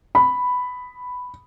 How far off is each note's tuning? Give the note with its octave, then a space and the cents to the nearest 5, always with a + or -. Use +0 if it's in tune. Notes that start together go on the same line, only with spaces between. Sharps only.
B5 +5